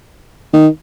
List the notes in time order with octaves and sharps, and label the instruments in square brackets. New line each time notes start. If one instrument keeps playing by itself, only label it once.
[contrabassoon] D#3